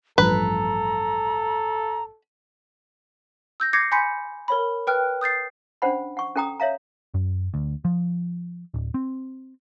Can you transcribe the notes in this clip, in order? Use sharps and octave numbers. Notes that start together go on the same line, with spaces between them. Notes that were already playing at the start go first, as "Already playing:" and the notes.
A1 G2 F3 A4 B4 A#5
E6 G6 A#6
D6 G6 G#6 A#6 C7 C#7
G#5 B5 C6 G6 B6 C#7
A#4 C#5 B5
B4 G5 F6 F#6
D#6 G6 A6 C7
C#4 D4 C5 F#5 B5
F#5 C#6
C#4 A4 G5 A#5 D#6
C#5 E5 F5 A#5
F#2
D2
F3
D1
C4